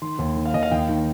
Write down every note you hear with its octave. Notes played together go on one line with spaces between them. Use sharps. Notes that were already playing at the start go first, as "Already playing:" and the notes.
D#3 C6
D#2
D#3
F5
D#2 D#5
F5
D#2 G5
D#3